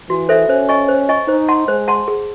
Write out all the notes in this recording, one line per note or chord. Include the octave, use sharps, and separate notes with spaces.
E3 F#4
A4 C5 E5
C#4 C5
D#5 G#5 C#6
C5
D#5 G#5 C#6
D#4 C5
F#5 A5 C6
G#3 C5
F#5 A5 C6
G#4